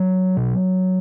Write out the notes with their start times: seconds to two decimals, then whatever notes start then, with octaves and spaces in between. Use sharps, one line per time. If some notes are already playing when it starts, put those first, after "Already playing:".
Already playing: F#3
0.37 B2